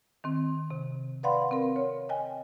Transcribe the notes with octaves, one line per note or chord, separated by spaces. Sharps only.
D#3 C4
C3
B4 D5 F5 F#5 B5 C6
C4 A#4
C#5
D#5 G5 G#5